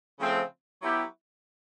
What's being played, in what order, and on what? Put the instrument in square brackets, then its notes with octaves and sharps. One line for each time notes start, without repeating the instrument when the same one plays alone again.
[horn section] C#3 F3 A3 C4
F#3 B3 E4 G4